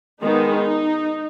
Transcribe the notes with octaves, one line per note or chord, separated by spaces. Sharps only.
D#3 G#3 B3 D#4